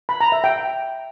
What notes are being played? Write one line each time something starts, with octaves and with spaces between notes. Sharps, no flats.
B5
A#5
E5
G5